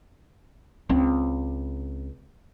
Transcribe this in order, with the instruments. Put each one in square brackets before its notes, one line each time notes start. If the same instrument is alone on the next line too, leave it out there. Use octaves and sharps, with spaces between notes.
[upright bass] C#2 C4